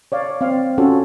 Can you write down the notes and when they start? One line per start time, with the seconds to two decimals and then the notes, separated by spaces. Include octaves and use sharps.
0.12 C#5 D5 F5
0.41 C4 F5
0.78 C#4 F4 F#4 A4